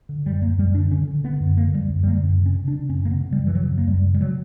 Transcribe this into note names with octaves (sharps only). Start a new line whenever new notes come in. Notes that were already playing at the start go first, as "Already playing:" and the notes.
D3
F#2 G3
F#2 A#3
F#2 G3
D3 D4
D3 C#4
D3
D3 B3
F#2
D3 A#3
F#2 G3
F#2
G3
D3 A#3
F#2
C#3
C#4
C#3
D4
C#3
F#2 C#4
C#3 A#3
B3
C#3
G3
F#2
E3
C#3 F#3
F#2
A#3
F#2 G3
C#3
G3
C#3 F#3